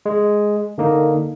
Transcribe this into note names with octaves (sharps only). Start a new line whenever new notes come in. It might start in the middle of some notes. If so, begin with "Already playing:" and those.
G#3
D3 A#3 D#4